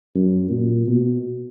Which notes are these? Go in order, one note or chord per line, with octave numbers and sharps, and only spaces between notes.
F#2
A#2
B2